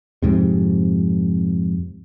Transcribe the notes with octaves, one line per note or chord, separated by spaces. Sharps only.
F2 G#2 C3